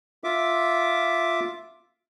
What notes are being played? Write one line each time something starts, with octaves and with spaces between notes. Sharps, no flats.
F4 E5 D6